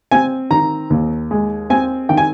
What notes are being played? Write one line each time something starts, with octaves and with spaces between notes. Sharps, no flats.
C4 G#5
D#3 A#5
D#2
G#3
C4 G#5
D#3 G5
G#5